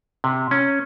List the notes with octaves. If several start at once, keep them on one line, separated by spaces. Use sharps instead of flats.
C3
C#4